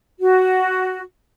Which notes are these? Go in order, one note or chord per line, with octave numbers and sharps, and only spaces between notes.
F#4